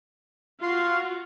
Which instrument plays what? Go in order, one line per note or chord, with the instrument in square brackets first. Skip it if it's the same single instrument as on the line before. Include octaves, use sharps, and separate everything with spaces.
[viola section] F4 F#4 [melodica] F5 C6